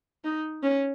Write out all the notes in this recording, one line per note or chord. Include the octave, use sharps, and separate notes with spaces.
D#4
C#4